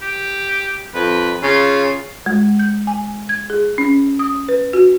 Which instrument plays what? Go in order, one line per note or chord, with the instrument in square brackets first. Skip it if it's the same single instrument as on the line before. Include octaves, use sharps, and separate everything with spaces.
[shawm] G4
[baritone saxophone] F2 [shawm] B4
[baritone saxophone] C#3 [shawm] F4
[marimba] G#3
G6
G#5
G#6
G#4
C#4
D#6
B4
F#4